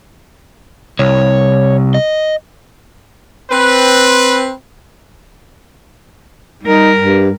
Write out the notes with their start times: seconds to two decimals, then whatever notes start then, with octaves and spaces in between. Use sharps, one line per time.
0.99 C2 C#5
1.94 D#5
3.50 C4 B4
6.63 G3 D#4 A#4
6.97 G2